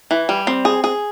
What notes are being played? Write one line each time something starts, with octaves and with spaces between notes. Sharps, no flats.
E3
G3
C4
G#4
G#4